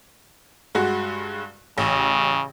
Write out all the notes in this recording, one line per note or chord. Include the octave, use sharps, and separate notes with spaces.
G2 G#3 F#4
A1 C#3